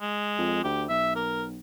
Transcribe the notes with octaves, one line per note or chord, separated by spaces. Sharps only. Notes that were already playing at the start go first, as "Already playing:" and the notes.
G#3
F2
D2 G4
B1 E5
A#4